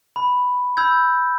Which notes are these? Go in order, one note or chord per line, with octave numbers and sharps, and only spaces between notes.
B5
B5 E6 G6 G#6